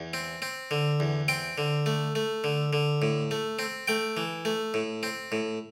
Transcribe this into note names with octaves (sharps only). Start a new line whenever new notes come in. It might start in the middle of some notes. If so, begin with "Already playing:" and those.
Already playing: E2
C4
C4
D3
E2
C4 G5
D3
A3
A3
D3
D3
A2
A3
C4
A3 G5
E3
A3
A2
C4
A2